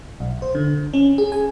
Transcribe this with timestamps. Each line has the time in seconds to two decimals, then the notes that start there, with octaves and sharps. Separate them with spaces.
0.20 B1
0.42 C5
0.55 D3
0.93 C#4
1.18 G#4
1.32 G#5